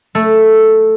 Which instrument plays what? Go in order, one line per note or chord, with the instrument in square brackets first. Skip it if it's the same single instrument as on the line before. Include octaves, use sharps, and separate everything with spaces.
[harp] A3